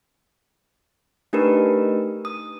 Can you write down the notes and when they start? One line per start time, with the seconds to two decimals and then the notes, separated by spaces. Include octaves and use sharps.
1.33 A3 D4 D#4 G4 A#4 B4
2.25 D#6